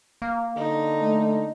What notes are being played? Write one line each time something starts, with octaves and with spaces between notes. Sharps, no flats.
A#3
D3 D#4
A3